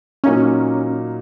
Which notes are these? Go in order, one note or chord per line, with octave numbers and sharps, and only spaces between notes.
A#2 F#3 A#3 C#4 D#4